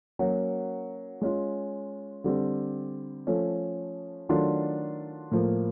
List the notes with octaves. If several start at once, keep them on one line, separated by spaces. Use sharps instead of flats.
F#3 A#3 C#4 F#4
G#3 C#4 F4
D3 G3 C4
F3 A3 C#4
D#3 F#3 A3 D4 F4
A2 F3 A#3